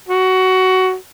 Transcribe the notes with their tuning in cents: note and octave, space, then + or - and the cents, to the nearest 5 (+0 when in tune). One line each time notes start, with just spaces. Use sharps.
F#4 +15